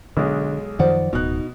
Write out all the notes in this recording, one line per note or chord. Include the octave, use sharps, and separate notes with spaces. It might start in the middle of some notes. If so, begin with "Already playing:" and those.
B1 D3 G#3
F#2 D#3 F3 C5 D5 F#5
D1 B2 D#4 F#6